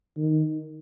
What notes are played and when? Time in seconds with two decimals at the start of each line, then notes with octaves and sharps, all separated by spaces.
0.17 D#3